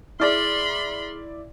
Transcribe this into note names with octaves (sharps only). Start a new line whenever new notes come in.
E4 G#4 D5 B5 C6 F6